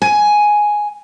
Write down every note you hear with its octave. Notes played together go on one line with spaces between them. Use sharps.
G#5